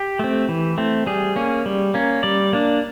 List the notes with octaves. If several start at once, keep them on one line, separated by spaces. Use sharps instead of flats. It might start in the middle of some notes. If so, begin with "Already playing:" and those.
Already playing: G4
A3 C4
E3
A3 C4
G3 G#4
A#3 C#4
G3
A#3 C#4
G3 D5
A#3 D4